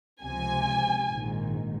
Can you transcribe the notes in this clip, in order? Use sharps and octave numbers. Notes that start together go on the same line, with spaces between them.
C#2 C3 F3 G#5
A#1 G#2 D#3